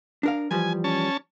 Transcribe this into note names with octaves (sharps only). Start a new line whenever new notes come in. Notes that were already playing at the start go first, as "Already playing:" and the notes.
D4 A#4 F5
E3 F3 G3 G#5
C#4 A5